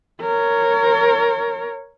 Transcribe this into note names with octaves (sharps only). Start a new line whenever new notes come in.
A#4 C#5